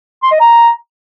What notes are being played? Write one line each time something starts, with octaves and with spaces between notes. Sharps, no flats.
C6
D#5
A#5